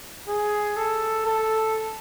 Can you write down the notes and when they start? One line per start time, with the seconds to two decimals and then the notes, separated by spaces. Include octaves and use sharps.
0.29 G#4
0.77 A4
1.26 A4